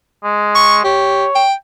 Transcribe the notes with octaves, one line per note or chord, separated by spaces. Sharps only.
G#3
C#6
G4 C#5
G5